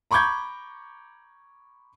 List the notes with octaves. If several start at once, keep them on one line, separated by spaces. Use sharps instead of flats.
A#5 B5 C#6 D6 G6 G#6